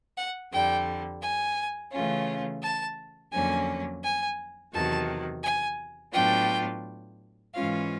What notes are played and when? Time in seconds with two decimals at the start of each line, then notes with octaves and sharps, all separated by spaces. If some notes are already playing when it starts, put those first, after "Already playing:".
0.17 F#5
0.52 F2 D3 G3 G5
1.22 G#5
1.92 C#3 E3 A3 C#4 F4
2.63 A5
3.32 F2 D3 F#3 A#3 C#4 G#5
4.03 G#5
4.73 E2 C3 D#3 F#3 A5
5.43 G#5
6.13 A2 F#3 B3 D4 F4 G5
7.54 G#2 E3 G#3 C#4 F4 F5